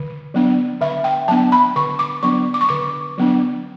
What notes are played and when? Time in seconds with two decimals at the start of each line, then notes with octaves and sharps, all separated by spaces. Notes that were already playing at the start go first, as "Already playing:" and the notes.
Already playing: D3
0.34 F#3 B3 D4
0.81 D3 E5
1.04 G5
1.28 F#3 B3 D4 A5
1.52 B5
1.76 D3 C#6
1.99 D6
2.23 F#3 B3 D4 C#6
2.54 D6
2.61 C#6
2.69 D3 D6
3.18 F#3 B3 D4